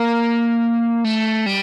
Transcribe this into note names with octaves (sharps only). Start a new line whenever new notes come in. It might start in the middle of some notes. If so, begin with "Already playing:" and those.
Already playing: A#3
A3
G3